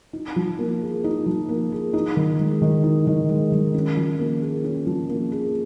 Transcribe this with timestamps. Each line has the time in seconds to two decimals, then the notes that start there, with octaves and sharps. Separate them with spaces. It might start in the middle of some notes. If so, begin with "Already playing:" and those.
0.13 D#4
0.36 F3
0.59 A#3
0.81 G#4
1.04 D#4
1.26 F3
1.49 A#3
1.72 G#4
1.93 D#4
2.17 D#3
2.39 G#3
2.62 D#3
2.84 D#4
3.07 D#3
3.29 G#3
3.52 D#3
3.75 C#4
3.97 F3
4.19 A#3
4.41 G#4
4.64 C#4
4.86 F3
5.09 A#3
5.32 G#4